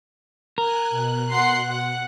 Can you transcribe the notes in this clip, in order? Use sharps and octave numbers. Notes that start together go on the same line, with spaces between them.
A#4 G#5 F#6
B2 F#6
F#5 C6 C7
F#5